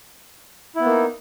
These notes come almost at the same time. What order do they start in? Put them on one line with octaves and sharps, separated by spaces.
E4 B3 A#3 D#4